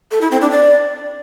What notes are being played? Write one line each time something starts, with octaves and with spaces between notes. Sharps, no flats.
A4
E4
C4
D4
D5